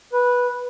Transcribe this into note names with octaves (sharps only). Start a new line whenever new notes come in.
B4